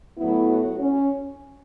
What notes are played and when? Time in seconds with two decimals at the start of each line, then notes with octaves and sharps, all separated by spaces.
0.17 A2 F#3 B3 E4
0.49 F#4
0.79 C#4